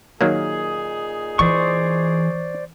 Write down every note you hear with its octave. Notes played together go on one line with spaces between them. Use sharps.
A#2 D#3 F#3 A#3 D#4 G#4
E3 C5 D5 C#6